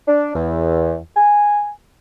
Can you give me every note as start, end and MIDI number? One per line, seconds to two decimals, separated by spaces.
0.08 0.31 62
0.34 0.96 40
1.16 1.70 80